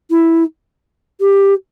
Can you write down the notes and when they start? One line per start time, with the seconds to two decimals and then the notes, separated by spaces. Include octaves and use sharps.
0.10 E4
1.21 G4